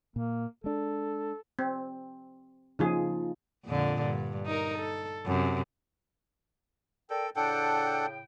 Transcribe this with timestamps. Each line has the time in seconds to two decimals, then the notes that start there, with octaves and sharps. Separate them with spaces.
0.16 A#2 A#3
0.64 G#3 D4 A4
1.59 C4
2.79 C#3 F3 A#3 D#4 F4 G#4
3.65 F2 A#2 D3
4.02 G2
4.46 D#4 A#4
4.79 A4
5.26 F#2 C3
7.10 A4 A#4 D5 G5
7.36 A2 C#3 D4 A4 F#5 G5